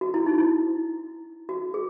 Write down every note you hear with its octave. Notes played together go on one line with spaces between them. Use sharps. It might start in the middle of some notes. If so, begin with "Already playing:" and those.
F#4
E4
D#4
E4
F#4
G#4